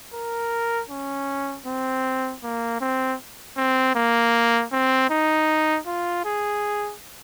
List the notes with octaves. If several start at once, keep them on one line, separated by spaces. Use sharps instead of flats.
A#4
C#4
C4
A#3
C4
C4
A#3
C4
D#4
F4
G#4